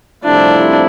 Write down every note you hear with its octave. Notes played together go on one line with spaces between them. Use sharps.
C2 C3 F3 A3 D4 E4